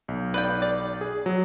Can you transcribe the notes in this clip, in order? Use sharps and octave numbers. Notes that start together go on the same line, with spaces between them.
B1
B4 D5 G5
D5
G#4
F#3